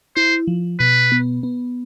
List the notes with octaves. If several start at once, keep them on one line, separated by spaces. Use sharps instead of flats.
E4 C5
F3
B2 B4
B3
B3